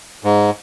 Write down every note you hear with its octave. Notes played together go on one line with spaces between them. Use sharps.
G#2